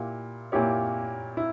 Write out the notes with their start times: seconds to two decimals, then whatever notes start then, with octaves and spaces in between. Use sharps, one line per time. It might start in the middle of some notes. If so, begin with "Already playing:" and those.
Already playing: A#2 A#3 E4 G4
0.52 A#2 A#3 E4 G4 C#5
1.37 E4